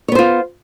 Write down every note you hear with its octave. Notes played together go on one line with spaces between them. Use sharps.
B3 F4 C5 C#5